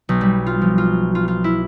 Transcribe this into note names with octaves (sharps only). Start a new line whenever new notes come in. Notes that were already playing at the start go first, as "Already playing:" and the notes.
B1
G3
F4
F3
F4
F4
F4
E4